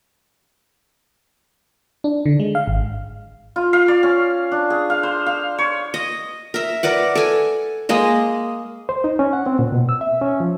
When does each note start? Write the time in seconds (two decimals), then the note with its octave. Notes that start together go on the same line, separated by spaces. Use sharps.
2.04 D4
2.26 D3
2.40 G#3
2.55 F5
2.68 G#1
3.56 F4
3.73 F5
3.88 D5
4.03 C#4
4.52 D4
4.70 G#4
4.90 F5
5.03 C5
5.26 F5
5.58 C#5
5.94 D#5
6.54 A#4 E5
6.83 A#4 B4 D5 F#5
7.15 A4 G#5
7.89 G#3 A#3 D#5
8.89 C5
9.04 D#4
9.19 C#4
9.33 F#5
9.46 C4
9.59 A#2
9.72 B2
9.89 E6
10.01 E5
10.21 C#4
10.40 F3